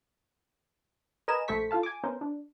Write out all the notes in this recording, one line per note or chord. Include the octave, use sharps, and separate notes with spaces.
A#4 B4 D#5 G#5 A#5 E7
A#1 A3 A4 C5 C#6 B6
F4 A4 F5 A5
G#5 D6
B3 C#4 A#4 C5
D4